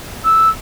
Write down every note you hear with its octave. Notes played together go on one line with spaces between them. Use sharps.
E6